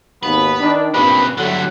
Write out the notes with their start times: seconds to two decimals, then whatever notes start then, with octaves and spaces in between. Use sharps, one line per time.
0.23 G#1 D#2 B3 B4
0.60 D#3 D4
0.94 G2 A#2 C#3 C4 B4
1.38 A2 D3 F#3 G3 F#5